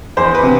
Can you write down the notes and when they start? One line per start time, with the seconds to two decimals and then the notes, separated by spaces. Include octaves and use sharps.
0.17 E2 C5
0.35 B4
0.43 C3